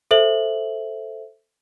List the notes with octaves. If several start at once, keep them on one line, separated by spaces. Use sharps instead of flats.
A4 C5 E5 F#7